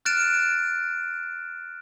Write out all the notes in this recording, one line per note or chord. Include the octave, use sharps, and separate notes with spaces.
F6 F#6 A6 D7 E7